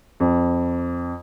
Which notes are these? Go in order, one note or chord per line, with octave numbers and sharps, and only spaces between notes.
F2